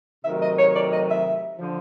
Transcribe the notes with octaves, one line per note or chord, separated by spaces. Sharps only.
C3 D#3 F#3 A3 E5
D#5
C#5
D5
D#5
E5
D3 F3